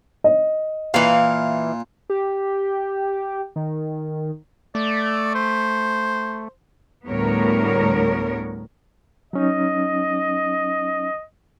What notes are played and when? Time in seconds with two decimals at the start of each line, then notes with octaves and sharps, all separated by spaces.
0.24 D#5
0.94 A#2 E3 F5
2.10 G4
3.56 D#3
4.75 A3 D5
5.34 C5
7.07 D2 A2 G3 B3 A#4 C#5
9.33 F#3 C#4 D#4 D#5